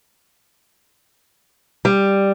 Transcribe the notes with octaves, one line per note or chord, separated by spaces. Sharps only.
G3